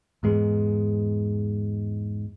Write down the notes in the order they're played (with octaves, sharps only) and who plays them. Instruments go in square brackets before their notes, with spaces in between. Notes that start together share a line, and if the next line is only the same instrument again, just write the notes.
[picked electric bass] E2 G#2 G#3 B3